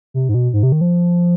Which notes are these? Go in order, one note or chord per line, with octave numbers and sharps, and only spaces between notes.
C3
G#2
B2
G#2
C3
D#3
F3